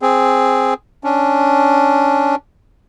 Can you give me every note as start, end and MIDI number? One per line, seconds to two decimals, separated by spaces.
0.02 0.74 60
0.02 0.74 68
1.04 2.35 61
1.04 2.35 62